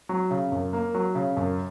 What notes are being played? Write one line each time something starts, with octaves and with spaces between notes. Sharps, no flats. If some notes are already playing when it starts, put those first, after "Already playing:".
F#3
C#3
F#2
A#3
F#3
C#3
F#2